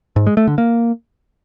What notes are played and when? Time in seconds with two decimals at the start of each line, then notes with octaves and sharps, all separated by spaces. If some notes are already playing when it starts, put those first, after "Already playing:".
0.16 G#2
0.27 G#3
0.37 A3
0.47 D3
0.58 A#3